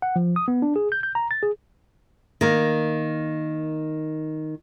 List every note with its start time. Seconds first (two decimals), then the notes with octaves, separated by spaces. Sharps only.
0.02 F#5
0.16 F3
0.36 D#6
0.48 B3
0.62 D4
0.76 G#4
0.92 G6
1.03 G6
1.15 A#5
1.31 A6
1.43 G#4
2.41 D#3 A#3